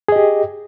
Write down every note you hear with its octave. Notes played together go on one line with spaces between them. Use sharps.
G4 G#4 D#5